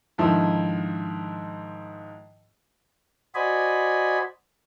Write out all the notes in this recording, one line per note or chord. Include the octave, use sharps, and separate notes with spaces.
G#2 D3 D#3 F3 E4
F#4 C5 D5 D#5 G#5 B5